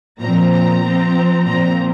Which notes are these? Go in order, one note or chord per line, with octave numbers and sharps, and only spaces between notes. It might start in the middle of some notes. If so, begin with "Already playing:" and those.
A#2 F3 C4 A#5
A#5
F3 C4
A#2 F3 C4 A#5